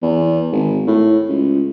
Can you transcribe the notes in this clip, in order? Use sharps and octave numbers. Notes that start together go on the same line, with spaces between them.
E2
G#1
A2
C#2